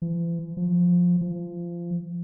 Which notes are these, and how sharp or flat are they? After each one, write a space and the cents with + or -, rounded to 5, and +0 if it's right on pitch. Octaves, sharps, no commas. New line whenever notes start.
E3 +45
F3 +15
F3 -20